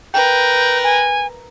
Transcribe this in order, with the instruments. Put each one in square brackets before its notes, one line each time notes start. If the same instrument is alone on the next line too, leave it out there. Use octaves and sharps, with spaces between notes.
[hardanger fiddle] A#4 B4 [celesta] G5 [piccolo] G6
[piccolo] G#5